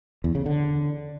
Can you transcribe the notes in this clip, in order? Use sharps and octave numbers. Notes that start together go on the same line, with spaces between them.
E2
C#3
D3